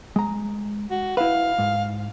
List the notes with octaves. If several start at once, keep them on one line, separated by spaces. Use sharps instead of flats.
G#3 A#5
F#4
E4 B4 F5
G#2